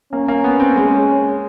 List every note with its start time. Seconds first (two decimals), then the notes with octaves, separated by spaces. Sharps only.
0.12 A#3 C#4
0.28 A#3
0.44 B3
0.60 C4
0.76 G#3